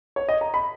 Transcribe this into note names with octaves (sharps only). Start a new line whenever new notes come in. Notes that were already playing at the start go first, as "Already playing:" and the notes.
C#5
D#5
A#5
B5